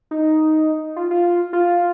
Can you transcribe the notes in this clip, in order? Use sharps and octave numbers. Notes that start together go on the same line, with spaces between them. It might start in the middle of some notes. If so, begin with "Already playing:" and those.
D#4
F4
F4
F4